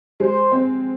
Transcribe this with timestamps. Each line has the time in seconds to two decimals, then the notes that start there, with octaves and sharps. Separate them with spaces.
0.20 G#3 C5
0.52 C4